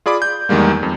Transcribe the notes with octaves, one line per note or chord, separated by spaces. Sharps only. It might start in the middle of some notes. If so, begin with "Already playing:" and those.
F4 G#4 D5 B5 D6
G6
E2 D#3 G3 G#3 A#3
F2